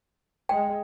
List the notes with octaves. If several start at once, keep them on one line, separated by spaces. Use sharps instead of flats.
G#3 G5